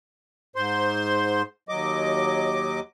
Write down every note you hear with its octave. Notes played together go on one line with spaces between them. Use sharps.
G#2 C5 C6
D#2 F#3 D#5 D6